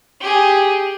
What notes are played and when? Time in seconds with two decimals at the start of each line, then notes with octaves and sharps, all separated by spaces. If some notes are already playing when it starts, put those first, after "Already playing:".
0.21 G4 G#4